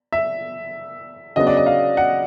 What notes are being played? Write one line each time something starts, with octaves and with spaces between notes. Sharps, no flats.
E5
C#3 F#3 B3 D4 D#5
D5
D#5
F5
F#5